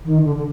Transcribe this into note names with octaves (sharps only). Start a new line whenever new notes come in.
D#3
D3
D3